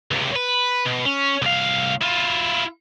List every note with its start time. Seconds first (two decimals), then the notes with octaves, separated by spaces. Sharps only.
0.11 C#2 C3
0.36 B4
0.86 B2
1.06 C#4
1.42 C2 F5
2.01 E4 F4